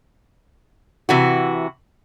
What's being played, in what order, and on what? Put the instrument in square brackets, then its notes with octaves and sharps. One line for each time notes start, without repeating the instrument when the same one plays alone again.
[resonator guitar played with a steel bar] C3 E3 F#4